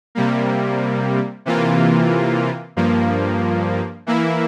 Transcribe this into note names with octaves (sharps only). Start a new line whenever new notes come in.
C3 G3 A#3
C3 E3 A#3 F4
G2 F3 A#3
E3 A#3 E4